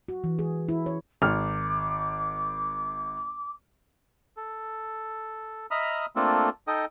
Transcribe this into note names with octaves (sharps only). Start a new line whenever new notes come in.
F#4
E3
G#4
E4
C#5
G#1 D6 F6
A4
D#5 E5 A#5 B5 D#6 F6
A3 A#3 C4 D4 F4 A4
D#4 A4 D#5 G5 D#6